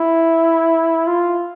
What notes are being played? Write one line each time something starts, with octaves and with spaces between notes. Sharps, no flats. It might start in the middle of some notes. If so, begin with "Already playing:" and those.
Already playing: E4
F4